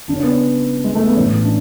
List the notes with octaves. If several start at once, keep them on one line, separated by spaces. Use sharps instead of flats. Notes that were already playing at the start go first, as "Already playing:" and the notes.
F#1 F#2 C#3 D4
C#4
B3
C#4
G#3
A3
B3
A1 A2 E3 C#4
D4